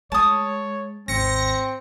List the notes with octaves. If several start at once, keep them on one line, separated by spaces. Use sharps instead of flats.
G#3 C#5 A5 D#6
G#1 D#2 C4 A#6 C#7